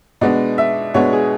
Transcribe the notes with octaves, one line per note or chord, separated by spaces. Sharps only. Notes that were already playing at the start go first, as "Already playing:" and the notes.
B2 G#3 B3 D4 D5
E5
B2 G#3 B3 D4 C#5
G#4